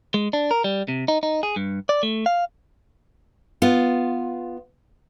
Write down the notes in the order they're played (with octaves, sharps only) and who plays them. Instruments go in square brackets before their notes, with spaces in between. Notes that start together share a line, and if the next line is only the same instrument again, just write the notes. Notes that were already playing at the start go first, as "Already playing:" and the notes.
[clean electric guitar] G#3
D4
A#4
G3
C3
D#4
D#4
G#4
G2
D5
A3
F5
[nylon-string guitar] B3 F4